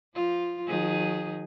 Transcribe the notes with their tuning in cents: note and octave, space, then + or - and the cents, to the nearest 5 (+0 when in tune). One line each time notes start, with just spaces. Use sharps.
F3 +0 F4 +0
D#3 +0 F#3 -45 G#4 +0